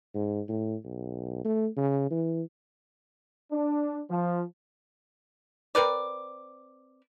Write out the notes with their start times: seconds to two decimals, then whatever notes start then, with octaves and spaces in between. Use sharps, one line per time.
0.15 G#2
0.49 A2
0.85 B1
1.45 A3
1.77 C#3
2.11 E3
3.51 D4
4.10 F3
5.75 C4 A#4 B4 D5